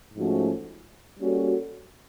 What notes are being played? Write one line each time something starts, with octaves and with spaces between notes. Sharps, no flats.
G#2 F3 A3 C#4 F#4
G3 A#3 C#4 F#4 A4